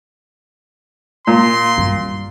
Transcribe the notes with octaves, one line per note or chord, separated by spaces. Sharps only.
A#2 C6
G2